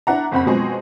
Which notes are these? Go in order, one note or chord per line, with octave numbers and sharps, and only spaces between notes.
D4 E4 F#5 A#5
F#1 F2 C4 F#5 B5
B2 F3 F#3 G#3 C4 G#4